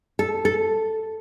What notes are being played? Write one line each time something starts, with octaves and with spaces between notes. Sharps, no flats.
A4
A4